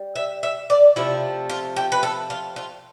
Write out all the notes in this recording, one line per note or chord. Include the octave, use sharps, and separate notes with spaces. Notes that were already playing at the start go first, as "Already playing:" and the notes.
Already playing: G3
E5
E5
D5
C3 F3 A3 E4
F4
G4
B4
A4
F4
F4